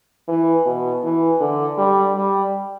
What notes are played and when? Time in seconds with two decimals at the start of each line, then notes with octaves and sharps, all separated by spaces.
0.28 E3
0.65 B2
1.04 E3
1.40 D3
1.78 G3
2.16 G3